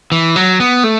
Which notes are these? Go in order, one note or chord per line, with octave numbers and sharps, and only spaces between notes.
E3
F#3
B3
A3